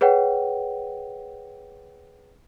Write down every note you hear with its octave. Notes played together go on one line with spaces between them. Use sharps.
G#4 B4 C#5 F#5 G5